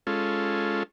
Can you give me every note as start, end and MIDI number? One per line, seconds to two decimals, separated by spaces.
0.07 0.83 56
0.07 0.83 61
0.07 0.83 65
0.07 0.83 69